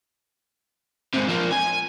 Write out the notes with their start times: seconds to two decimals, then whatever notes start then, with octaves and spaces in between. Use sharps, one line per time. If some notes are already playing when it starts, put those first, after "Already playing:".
1.14 G#2 C3
1.28 F3 A#3
1.51 G#5